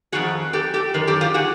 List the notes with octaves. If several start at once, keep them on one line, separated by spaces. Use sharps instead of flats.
F2 C3 D#3 F#4 G#4
G4 A4
G4 A4
F#2 D#3 A#4
G4 A4
F4 G4
F#4 G#4